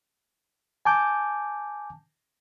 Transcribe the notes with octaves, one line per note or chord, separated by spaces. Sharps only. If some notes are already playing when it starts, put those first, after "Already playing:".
G#5 A5 D6 G6